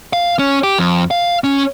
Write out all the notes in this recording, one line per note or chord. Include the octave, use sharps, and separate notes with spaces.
F5
C#4
G4
F2
F5
C#4